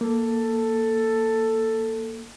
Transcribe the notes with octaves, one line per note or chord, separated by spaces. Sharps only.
A#3 A4